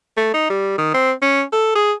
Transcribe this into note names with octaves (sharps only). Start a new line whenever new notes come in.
A3
D#4
G3
D#3
C4
C#4
A4
G#4